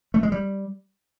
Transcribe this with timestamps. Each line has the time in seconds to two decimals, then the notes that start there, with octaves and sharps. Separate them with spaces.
0.14 A3
0.23 G#3
0.32 G3